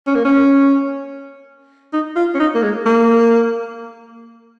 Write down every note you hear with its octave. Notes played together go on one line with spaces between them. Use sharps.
C#4
A#3
C#4
D#4
F4
C#4
D#4
A#3
G#3
A#3